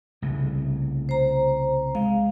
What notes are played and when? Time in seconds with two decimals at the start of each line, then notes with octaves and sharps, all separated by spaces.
0.22 C2 C#3 A3
1.09 C5 A#5
1.95 G#3 F5